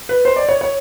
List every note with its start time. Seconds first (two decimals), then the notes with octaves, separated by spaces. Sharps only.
0.09 B4
0.25 C5
0.36 D5
0.49 C#5
0.61 C#5